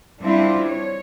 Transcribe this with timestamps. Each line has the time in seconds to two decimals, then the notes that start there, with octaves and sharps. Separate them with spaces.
0.22 G3 C4 D4 E4 F4
0.66 C#5